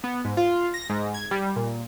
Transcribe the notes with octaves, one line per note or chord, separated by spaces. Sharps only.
B3
G#2
F4
A#6
G#2
G#6
G3
A#2